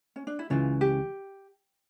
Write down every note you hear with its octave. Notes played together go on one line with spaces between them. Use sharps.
C#4
D4
E4
C#2 C#3 E3 F4
G4